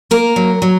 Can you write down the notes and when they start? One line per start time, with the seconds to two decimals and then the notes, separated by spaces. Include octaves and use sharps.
0.11 A#3 A#4
0.36 F#3
0.62 F#3